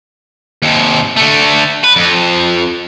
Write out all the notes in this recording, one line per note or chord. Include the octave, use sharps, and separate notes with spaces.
D#2 C3
D3 A3
B4
F2